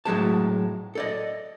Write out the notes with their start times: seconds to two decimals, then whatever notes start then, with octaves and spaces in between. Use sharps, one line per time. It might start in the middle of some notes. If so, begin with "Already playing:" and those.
0.05 A2 F#3 G#3 A5
0.95 A4 D5 D#5